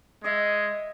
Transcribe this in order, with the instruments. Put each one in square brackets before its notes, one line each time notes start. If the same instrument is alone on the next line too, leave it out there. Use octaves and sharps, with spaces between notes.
[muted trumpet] G#3 [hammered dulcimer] D#5 E5